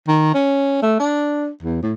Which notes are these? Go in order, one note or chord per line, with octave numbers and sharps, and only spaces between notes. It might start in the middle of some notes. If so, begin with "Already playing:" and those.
D#3
C#4
A3
D4
E2
A2